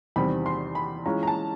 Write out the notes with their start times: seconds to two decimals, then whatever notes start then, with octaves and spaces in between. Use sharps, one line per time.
0.16 E2 C3 D#3 G3 C4 B5
0.46 C6
0.75 B5
1.06 E3 G#3 C#4 F4 A#5
1.23 A#5
1.27 A5